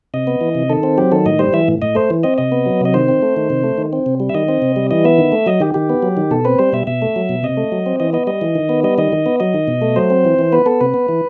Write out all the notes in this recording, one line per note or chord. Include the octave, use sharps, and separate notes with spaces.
C3 D#5
B3
E3
C3
D#3 A4
C4
F#3 G4
D#3 A4
A2 D#5
G3 C5
E3 E5
A2
A2 D#5
A3 C5
E3
C4 D#5
C3 D#5
B3
F#3
C3 D#5
D#3 C5
C4
A3
D#3
C3
A3
D#3
C4
C3
G3
E5
D#3 D#5
C4
C3
G3
E3 D#5
B3 E5
D#3
A3
F#3 D#5
D#3 G4
D#3 G4
B3
F#3
D#3
B2 A4
C4 B4
G3 C5
B2 E5
B2 E5
A3
F#3
B2
C3 D#5
A3
F#3
C4
E3 D#5
B3 D#5
G3 D#5
E3
D#3
B3
G3 D#5
D#3 D#5
D#3
B3
F#3 D#5
D#3
B2
A3
F#3 C5
C4
E3
E3
B3 B4
B3 A4
C3 B4
B3
E3